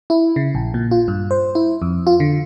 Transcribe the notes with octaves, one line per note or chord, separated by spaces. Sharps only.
E4
C#3
A#1
A#2
F4
G2
C5
E4
F2
F4
D3